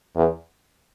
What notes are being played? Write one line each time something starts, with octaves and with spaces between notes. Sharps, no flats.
E2